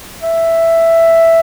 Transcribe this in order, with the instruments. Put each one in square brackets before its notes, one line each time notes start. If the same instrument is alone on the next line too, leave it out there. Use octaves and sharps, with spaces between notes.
[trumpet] E5